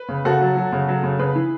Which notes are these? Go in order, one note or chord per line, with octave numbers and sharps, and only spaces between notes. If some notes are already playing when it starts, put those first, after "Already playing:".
Already playing: B4
C#3
C#3 F#4 A4
F#3
F#3
C#3
F#3
C#3
C#3 G#4 B4
E3